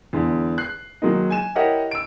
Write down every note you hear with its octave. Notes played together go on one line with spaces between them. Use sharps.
E2 D3 G#3
F#6 C7
D#3 F#3 G#3 A#3 D#4
G#5 E7
E4 G4 A#4 C#5 D#5 F#5
E6 D7